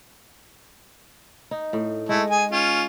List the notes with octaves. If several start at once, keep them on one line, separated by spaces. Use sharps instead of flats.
D#4
A2
G#3 A3 E4
G#4 G#5
C#4 F4